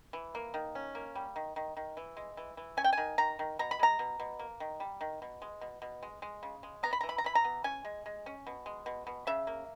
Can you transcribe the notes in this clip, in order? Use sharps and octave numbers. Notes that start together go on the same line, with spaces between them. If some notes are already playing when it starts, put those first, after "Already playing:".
E3
A#3
D#3
C#4
A#3
G3
D#3
D#3
D#3
E3
G#3
E3
E3
C#4 G#5
G5
D#3 G#5
D#3 A#5
D#3
B2 A#5
B5
G#3 A#5
B2
B2
A#3
D#3
G3
D#3
B2
G#3
B2
B2
G#3
G#3
C#3
G#3
B3 A#5
B5
E3 A#5
B5
A#5
E3 B5
A#5
B3
C#4 G#5
G#3
G#3
C#4
B2
G#3
B2
B2
C#3 E5
A#3